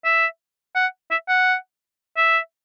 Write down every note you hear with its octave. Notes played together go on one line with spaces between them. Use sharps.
E5
F#5
E5
F#5
E5